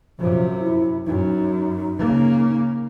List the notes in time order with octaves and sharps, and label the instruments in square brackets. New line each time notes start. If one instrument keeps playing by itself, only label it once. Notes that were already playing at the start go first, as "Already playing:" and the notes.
[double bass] F#2 C3 [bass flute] F3
[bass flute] E4
[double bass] F#2 [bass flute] D#4
[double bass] C#3 A#3